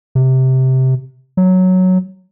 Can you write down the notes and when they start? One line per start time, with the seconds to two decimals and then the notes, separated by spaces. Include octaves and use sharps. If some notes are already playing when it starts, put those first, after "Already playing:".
0.15 C3
1.37 F#3